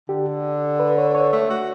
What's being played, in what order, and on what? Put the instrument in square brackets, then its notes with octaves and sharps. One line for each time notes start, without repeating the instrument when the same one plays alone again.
[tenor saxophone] D3 [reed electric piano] G4
[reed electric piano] B4
C#5
C#5
[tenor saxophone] A3
F#4